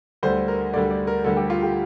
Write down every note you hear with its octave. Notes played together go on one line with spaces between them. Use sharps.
D2 D3 G3 C5
A#4
D2 D3 G3 D5
D5
A#4
D2 D3 G3 A4
G4
F4
G4